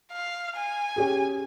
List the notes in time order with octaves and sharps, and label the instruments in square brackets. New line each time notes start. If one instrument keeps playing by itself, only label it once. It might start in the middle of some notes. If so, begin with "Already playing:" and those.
[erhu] F5
G#5
[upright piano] C#4 G4 G#4